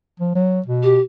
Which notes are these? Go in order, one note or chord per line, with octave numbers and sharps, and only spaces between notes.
F3
F#3
B2
G4